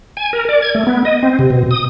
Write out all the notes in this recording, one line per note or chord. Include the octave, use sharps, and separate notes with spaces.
G#5
A#4
D5
G#6
A3
B3
D#5
C4
C3
B2
D#6